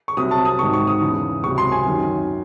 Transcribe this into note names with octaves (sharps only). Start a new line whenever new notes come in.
C#6
C2 C3 F#3 D#6
A5
D#6
G#2 D#3 F#3 C#6
C#6
D#6
E2 C#3 E3
C#2 C3 F#3 C#6
C6
G#5
F#2 D#3 F#3